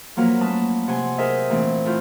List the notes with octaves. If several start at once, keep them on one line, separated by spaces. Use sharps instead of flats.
F3 F#3 A#3 F#4 A#4 B4
A3 C#4 B4 A5 D#6
C3 F#5 G#5 C6
G#4 A#4 C5 D#5 E5
A#2 E3 A3 C4
A2 F4 G6